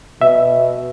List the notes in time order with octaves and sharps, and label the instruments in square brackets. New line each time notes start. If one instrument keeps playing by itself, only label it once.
[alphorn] B2 [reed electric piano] E5